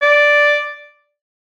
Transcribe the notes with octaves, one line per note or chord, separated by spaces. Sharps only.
D5